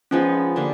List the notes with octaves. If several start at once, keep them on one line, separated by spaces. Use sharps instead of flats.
F3 G#3 B3 C#4 D#4
D3 G3 A#3